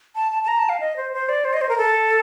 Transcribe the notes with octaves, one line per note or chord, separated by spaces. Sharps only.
A5
A5
A5
A#5
A5
F5
D#5
C5
C5
D5
C5
D#5
C5
A#4
A4